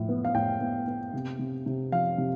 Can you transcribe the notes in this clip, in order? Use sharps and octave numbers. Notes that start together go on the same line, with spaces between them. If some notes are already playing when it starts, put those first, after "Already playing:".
Already playing: A2 F3
B3
F5
A2 G5
B3
B3
C3
C3
C3
F3 F5
C3